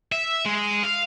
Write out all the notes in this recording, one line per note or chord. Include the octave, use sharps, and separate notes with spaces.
E5
G#3
F5